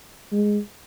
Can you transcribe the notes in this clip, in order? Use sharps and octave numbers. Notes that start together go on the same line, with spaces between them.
G#3